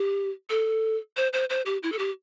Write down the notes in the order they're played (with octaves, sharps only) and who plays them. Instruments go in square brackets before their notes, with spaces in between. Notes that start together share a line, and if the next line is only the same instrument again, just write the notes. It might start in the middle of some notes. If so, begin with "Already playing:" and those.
Already playing: [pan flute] G4
A4
C5
C5
C5
G4
E4
A4
G4